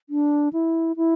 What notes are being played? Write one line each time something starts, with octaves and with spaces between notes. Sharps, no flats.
D4
E4
E4